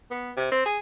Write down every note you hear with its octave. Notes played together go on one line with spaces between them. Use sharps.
B3
C3
C4
G#4